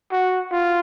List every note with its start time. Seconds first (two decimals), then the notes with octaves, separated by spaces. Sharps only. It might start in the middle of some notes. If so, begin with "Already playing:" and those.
0.11 F#4
0.52 F4